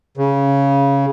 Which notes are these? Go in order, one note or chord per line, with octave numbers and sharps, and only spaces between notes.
C#3